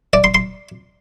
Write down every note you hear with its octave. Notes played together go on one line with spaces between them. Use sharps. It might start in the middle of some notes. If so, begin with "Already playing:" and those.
D5
C6
C6